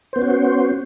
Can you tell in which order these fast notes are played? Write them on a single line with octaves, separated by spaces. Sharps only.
C5 B3 C#4 F#4